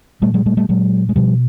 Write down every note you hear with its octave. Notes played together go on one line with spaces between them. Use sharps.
A#2 G3 A3
F#3 G#3
G3 A3
G3 A3
A#2 F#3 G#3
G#3
B2 F3 G3